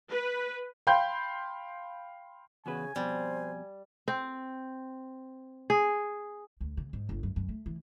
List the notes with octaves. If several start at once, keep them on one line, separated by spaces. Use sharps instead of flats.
B4
F5 G5 B5 C6 G6
E2 C#3 F#4 B4 G#5
F2 B2 G3 C5
C4
G#4
D2
C#3
G#2
G1
F#2
F#2
A3
E3